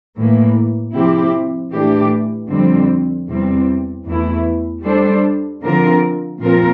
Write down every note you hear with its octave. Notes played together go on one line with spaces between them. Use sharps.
A2 E3 A#3
C3 F3 C4 E4 G4
A2 E3 A3 D4 G4
F2 D3 G3 C4
E2 C3 G3 C4
E2 E3 A3 E4
G3 D4 A4 C5
D3 F3 C4 F4 A#4
A#2 F3 C4 F4 A#4